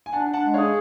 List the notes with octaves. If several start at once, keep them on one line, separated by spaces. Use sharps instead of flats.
G#5
D4 F#5 A5
D4
F#5 A5
G#3
C#5 F5
G#4